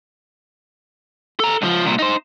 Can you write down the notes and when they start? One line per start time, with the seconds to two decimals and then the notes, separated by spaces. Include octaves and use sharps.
1.40 A4 A#5
1.62 C#2 F3
1.86 C2 A#2
1.99 D#4 C5